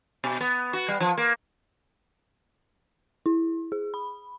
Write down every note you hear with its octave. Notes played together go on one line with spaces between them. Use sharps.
B2
B3
F#4
G3
F3
A#3
E4
G#4
B5